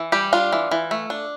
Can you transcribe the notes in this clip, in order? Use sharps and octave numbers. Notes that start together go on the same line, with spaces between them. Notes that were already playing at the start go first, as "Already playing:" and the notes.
Already playing: E3
G3 G4
D4 F4
E3
E3
A3
D4